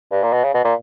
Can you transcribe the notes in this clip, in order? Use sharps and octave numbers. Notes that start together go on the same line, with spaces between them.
G2
A#2
B2
C#3
B2
A#2